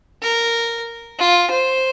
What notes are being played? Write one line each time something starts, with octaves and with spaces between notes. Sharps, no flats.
A#4
F4
C5